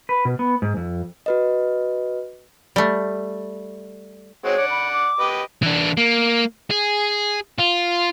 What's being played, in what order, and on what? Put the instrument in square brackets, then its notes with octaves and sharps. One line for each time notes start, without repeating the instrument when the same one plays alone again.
[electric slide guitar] B4
B2
B3
G#2
F2
[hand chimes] F#4 B4 D#5
[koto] G3 A3
[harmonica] G#3 C4 F#4 [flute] C#5
[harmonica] D5 F#5
[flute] B5
D6
[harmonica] G4 B4 D#5
[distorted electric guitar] E3 D4
A#3
G#4
F4